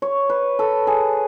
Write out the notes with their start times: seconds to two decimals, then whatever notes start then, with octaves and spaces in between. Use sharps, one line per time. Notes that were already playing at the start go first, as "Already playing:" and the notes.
0.02 C#5
0.30 B4
0.59 A4
0.87 G#4